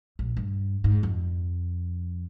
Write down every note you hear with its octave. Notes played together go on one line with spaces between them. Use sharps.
A#1
G2
G#2
F2